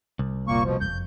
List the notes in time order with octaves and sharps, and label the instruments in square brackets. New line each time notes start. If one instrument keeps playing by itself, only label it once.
[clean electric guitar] C2
[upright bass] F1 [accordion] A#2 A#3 C#6
[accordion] B2 F3
[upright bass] F#1 F2 [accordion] G6